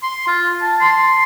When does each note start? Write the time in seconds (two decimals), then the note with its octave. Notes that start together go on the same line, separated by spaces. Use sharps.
0.03 C6
0.27 F4
0.61 A5
0.81 C6